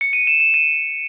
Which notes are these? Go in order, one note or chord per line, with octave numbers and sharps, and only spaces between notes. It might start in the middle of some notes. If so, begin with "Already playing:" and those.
C#7
D#7
E7
E7
D#7